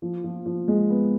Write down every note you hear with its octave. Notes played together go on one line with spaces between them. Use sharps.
F3
F3
F3
G#3
B3